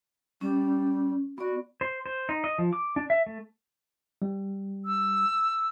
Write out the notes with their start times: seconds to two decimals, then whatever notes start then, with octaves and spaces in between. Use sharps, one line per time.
0.41 G3 C#4
1.38 B3 F#4 D5
1.81 C5
2.06 C5
2.29 D#4
2.44 D#5
2.58 F3
2.73 D6
2.96 D4
3.10 E5
3.26 A3
4.22 G3
4.85 E6